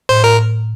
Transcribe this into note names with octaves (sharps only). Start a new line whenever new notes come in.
A2 C5
A2 A#4